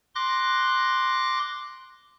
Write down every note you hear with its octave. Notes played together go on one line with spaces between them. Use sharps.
C6 D6 F#6 A#6